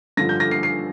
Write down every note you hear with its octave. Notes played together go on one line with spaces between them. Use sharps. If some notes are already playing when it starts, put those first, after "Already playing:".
G2 D3 F3 A#6
G6
A#6
C7
C7